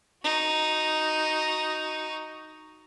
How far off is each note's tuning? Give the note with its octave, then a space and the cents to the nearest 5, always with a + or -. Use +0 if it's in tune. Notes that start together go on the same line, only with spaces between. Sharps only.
D#4 +0 F#4 +0